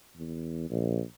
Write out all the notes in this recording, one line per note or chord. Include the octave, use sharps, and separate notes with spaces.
E2
A#1